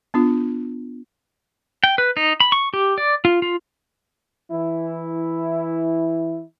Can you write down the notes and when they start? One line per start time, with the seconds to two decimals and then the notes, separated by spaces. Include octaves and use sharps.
0.14 B3 D4 F4
1.84 G5
1.98 B4
2.17 D#4
2.40 B5
2.52 C#6
2.74 G4
2.98 D5
3.25 F4
3.42 F4
4.51 E3 E4